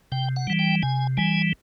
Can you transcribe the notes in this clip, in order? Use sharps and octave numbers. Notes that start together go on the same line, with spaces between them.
C3 G5
F#5
E3 G3
G5
C3 G#5
E3 G3 G#5